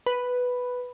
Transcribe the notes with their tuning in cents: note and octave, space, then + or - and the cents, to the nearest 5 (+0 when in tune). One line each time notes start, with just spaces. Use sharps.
B4 +0